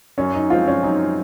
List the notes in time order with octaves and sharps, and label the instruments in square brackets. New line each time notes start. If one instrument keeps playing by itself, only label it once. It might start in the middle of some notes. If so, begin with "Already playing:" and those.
[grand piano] F#2 [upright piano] C#4
[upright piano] D#4
[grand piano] F3 G#3 C4 [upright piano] F4
[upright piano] C#4
[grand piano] F#2 [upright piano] D#4